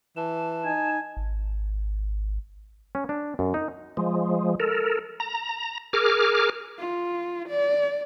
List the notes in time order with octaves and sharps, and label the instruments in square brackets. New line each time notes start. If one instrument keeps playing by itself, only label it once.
[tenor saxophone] E3 [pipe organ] A5
[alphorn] D#4 [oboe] G#5
[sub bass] G#1
[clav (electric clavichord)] C#4
D4
F#2
D#4
[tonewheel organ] F3 G#3
A4 A#4
A#5
G#4 A#4 D6 F6
[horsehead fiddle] F4
D5